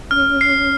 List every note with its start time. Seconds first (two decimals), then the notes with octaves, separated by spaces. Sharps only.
0.11 C#4 F6
0.41 C7